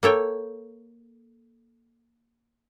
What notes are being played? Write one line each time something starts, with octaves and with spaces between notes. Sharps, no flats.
A#3 A4 C#5 G5